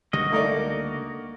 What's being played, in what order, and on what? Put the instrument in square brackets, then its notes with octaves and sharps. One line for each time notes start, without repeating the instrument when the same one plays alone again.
[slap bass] C#2 D3 G3 [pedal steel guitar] A#3 F#4 D#5
[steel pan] A3 [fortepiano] D#4 A#4 D5